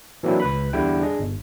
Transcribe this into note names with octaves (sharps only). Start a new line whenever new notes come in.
E3 F#3 A#3 C4 D4 E4
C#2 B4 B5
E2 D3 G3 E4 G5
D4 G#4 D#5
G1